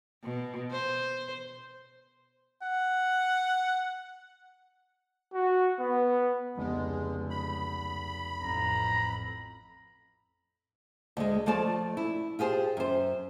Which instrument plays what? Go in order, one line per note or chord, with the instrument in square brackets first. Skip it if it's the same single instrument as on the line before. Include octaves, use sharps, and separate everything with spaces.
[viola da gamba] B2
C5
[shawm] F#5
[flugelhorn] F#4
B3
[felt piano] F1 B3 [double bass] C#2 [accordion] G#3
[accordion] B5
[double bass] A1 F2 [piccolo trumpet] A#5
[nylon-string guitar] D2 G#3
F3 A3 C#5 D5 A5
E4
F4 G4 G#4 C5
F#2 C5